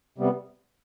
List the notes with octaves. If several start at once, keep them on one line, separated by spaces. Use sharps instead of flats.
C3 G3 B3